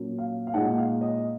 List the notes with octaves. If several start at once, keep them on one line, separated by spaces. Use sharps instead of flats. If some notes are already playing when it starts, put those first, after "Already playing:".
Already playing: A#2 F#3 A#3 C#4
F5
F5
A#2 G#3 D#4 F#5
F5
D#5